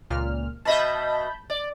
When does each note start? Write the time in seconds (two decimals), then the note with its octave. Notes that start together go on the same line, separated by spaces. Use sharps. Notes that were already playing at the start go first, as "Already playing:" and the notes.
0.10 C#2 A#2 F6
0.65 B2 D#5 E5 A5 B5 G6
1.50 D5